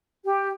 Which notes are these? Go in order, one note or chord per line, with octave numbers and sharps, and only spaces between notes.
G4